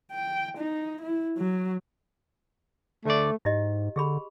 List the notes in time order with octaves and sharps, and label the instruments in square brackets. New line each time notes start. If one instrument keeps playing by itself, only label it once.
[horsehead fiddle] G5
D#4
E4
F#3
[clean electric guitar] D2 D5 [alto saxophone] A3
[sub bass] G#2 [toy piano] E4 G4 D#5
[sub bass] D3 [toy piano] G4 G#4 B5